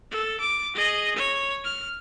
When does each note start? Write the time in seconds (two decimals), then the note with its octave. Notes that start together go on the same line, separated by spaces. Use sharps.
0.11 A4
0.40 D6
0.75 G#4 D#5
1.16 C#5
1.65 F6